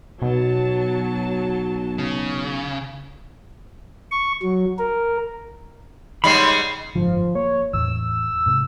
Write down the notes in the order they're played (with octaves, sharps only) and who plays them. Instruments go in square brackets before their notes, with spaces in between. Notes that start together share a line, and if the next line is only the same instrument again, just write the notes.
[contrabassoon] B1 [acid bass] B2 [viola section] F#3 A5
[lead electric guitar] C#3
[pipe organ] C#6
F#3
A#4
[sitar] G#2 C#3 G3 [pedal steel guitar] B5 C6
[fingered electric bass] F#1 G#2 D3 [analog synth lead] F3
[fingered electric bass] A#3 [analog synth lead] C#5
[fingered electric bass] E2 A2 E3 [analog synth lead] E6
[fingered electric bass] G#2 C3 G#3